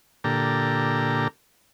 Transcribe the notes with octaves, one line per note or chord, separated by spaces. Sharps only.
A#2 D3 G4 A4 A#5